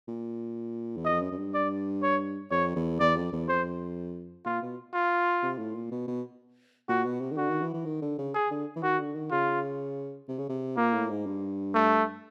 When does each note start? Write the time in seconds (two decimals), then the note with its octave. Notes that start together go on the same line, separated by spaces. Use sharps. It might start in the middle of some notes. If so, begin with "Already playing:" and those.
0.08 A#2
0.96 E2
1.05 F2 D#5
1.21 F#2
1.32 F#2
1.37 G2
1.54 D5
2.02 C#5
2.51 F2 C#5
2.76 E2
3.00 E2 D5
3.16 F2
3.32 E2
3.48 F2 C5
4.45 A#2 F4
4.62 B2
4.94 F4
5.43 C3
5.59 A2
5.75 A#2
5.91 B2
6.08 B2
6.89 A#2 F#4
7.05 B2
7.21 C3
7.31 D#3
7.37 D3 F#4
7.49 D#3
7.61 E3
7.74 E3
7.85 D#3
8.02 D3
8.18 C#3
8.34 G#4
8.51 D3
8.76 E3
8.83 D#3 F#4
8.99 D3
9.15 D#3
9.31 C#3 F4
10.29 C3
10.39 C#3
10.49 C3
10.77 A#2 A#3
10.94 A2
11.10 G#2
11.26 G2
11.74 A3